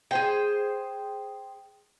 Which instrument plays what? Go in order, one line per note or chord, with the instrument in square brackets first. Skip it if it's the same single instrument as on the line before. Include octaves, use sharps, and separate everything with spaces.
[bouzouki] G#4 C5 G5